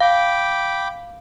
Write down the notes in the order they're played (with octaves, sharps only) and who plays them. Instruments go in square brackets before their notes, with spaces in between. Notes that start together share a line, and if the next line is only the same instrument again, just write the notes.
[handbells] F5 [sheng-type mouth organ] G5 B5 D6